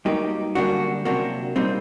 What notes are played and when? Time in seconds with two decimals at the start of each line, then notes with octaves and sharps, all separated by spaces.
0.05 G2 F#3 A#3 D#4 G4
0.55 F#2 D3 G3 A#3 D4 F#4
1.05 C3 F#3 A#3 D4 F#4
1.56 A#2 G3 A#3 C4 D#4